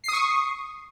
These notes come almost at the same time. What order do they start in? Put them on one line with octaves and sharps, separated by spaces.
C7 D#6 C#6